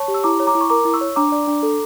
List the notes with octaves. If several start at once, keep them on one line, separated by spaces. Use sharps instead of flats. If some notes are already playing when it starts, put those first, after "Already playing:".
Already playing: C#5 A5 C#6
G4
E6
E4 A#5 D6
C#5
A#5 D6
E4
C#6
A#4 A#5 D6
E4
C#6 E6
C#5
D4 A#5 D6
D5
D4
A4